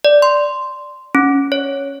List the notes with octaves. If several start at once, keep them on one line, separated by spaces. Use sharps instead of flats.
D5
C6
C#4
C#5